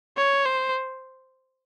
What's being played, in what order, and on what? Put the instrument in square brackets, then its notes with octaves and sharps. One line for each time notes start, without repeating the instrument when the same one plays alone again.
[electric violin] C#5
C5